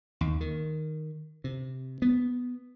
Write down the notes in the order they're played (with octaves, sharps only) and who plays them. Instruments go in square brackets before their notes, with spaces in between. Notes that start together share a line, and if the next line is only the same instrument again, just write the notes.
[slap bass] D#2
D#3
C3
B3